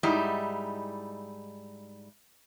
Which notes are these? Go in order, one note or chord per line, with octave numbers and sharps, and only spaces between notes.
G#2 G3 D#4 E4